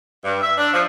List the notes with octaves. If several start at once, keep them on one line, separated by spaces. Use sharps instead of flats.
G2
E5
D4
F3